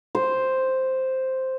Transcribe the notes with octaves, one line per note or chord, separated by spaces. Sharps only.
C5